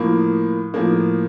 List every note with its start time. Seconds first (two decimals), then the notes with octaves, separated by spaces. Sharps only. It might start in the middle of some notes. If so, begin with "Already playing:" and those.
Already playing: A2 F3 A#3
0.74 A2 F3 A#3